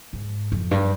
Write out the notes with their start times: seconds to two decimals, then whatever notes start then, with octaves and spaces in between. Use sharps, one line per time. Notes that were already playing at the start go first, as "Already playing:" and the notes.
0.13 G#2
0.52 F2
0.71 G2